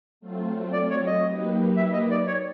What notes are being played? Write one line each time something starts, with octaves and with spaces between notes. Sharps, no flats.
F#3 A3 C4 F4
D5
C#5
D#5
F#3 A#3 D#4 G4 B4
E5
D#5
D5
C#5